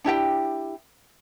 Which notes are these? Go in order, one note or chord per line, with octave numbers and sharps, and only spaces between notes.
D4 E4 G4 G5